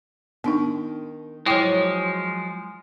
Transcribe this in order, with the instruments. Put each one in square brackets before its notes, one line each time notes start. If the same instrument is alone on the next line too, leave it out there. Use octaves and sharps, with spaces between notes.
[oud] D#3 [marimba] B3 D4 D#4
[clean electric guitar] F3 G#3 [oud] F#3 C#5 [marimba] E4 G5 D6